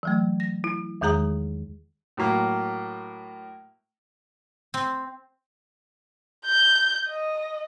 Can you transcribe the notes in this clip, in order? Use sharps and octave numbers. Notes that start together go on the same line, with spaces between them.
E3 F#3 A3
A#6
E4
E2 D#3 G#3 G#4 A#5 D#6
A2 F#3 A#3
C4
G6
D#5